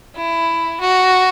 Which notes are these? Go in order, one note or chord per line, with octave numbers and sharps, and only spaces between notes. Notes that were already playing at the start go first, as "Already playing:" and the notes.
E4
F#4